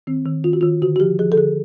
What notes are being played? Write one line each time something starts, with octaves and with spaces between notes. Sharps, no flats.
D#3 C4
D#3
D#3 F4
F#4
D#3 F4
D3 F#4
F#4
F3 G4
F3 G#4
A4
D3 G#4